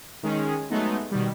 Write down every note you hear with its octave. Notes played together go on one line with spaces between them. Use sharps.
D#3 G#3 C#4 G#4
F#3 G#3 A3 B3 D#4
B2 D#3 G3